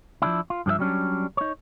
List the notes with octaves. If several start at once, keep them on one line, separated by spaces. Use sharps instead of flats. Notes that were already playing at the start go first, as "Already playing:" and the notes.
F3 F#3 D4 E4
F4
G2 F3 G#4 E5
F#3 G3 C#4 D4
D#4 C#5